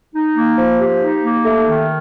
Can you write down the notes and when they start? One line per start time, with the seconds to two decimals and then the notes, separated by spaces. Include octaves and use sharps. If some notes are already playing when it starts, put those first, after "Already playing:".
0.15 D#4
0.37 A#3
0.58 F3
0.80 G4
1.02 D#4
1.23 A#3
1.44 A3
1.67 D#3